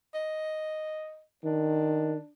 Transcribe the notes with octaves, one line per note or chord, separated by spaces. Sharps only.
D#5
D#3 D4